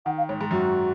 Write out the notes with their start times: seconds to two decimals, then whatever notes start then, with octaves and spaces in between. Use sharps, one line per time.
0.06 D#3 F#5
0.18 F5
0.29 G#2 C#5
0.40 G#2 G#4
0.51 F#2 F#4